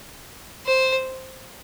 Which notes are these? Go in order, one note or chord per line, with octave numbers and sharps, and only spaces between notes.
C5